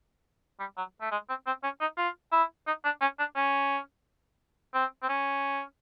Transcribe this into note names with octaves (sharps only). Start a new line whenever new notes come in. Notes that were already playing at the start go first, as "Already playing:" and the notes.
G3
F#3
A3
G#3
C4
C4
C#4
D#4
F4
E4
D#4
D4
C#4
D4
C#4
C4
C4
C#4